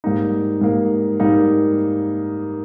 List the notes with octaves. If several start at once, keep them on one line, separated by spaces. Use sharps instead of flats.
G#2 G3 A#3 D#4
G#2 G3 A#3 D#4
G#2 G3 A#3 D#4